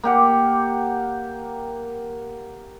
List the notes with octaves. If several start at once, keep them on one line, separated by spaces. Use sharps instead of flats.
A#3 G4 F#5